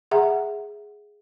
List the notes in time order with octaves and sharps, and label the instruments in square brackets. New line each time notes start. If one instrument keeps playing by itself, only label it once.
[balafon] G#4 E5 F#5 A#5